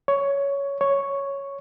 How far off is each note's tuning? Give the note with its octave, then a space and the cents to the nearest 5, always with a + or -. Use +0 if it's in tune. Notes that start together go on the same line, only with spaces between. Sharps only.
C#5 +10
C#5 +0